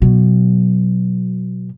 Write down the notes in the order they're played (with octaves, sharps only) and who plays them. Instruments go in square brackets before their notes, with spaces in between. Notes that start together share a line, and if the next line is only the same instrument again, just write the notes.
[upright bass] B2 F#3